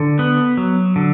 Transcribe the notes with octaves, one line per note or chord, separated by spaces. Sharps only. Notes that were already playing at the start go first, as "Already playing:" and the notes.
Already playing: D3
B3
F#3
D3